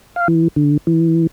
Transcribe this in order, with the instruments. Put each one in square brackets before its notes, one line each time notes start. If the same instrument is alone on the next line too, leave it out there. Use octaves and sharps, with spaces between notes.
[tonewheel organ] F5
E3
D3
E3